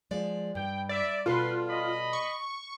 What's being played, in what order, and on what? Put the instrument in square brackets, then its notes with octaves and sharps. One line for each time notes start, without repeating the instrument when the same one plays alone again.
[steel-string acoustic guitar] F3 G#3 D5
[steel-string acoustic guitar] G2 [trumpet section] G5
[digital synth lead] D5 [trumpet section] E5
[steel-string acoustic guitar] B2 A4 D5 [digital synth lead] F4 [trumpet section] B4 C6
[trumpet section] D#5 B5
[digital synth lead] C#6